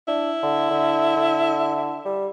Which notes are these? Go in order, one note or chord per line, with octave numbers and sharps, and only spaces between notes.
D4 E4
D3
D3
D3
G3